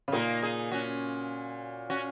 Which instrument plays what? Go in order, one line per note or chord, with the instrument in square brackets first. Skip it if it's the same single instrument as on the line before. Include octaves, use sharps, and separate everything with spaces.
[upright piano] C#3
[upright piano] A#2 [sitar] A#3 D#4
[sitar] D#4 G#4
C#4 F#4
C#4 F#4